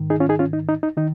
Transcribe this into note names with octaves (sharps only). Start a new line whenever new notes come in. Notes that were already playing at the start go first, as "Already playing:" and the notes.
Already playing: G#2 D#3
D#4 G#4
C#4 F4
D#4 G#4
C#4 F4
D#4
D#4
D#4
D#3 D#4